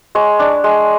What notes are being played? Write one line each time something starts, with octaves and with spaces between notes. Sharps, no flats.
G#3 C#5
D4
G#3